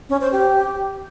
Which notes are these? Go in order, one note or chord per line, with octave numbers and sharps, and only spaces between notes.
C#4
C5
G4